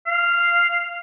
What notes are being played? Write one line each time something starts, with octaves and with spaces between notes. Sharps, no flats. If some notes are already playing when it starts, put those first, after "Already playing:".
F5